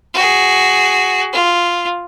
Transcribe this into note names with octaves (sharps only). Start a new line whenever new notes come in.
F#4 G#4
F4